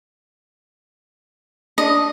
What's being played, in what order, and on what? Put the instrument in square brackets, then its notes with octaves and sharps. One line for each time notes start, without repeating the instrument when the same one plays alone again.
[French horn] D4 [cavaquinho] D#5